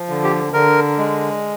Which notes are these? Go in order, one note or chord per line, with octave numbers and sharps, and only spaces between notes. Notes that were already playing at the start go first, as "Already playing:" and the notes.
Already playing: F3
D3
G4
D3 A#4
G#3